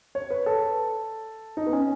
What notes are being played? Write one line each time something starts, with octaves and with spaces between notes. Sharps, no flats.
C#5
B4
A4
D#4
B3
C#4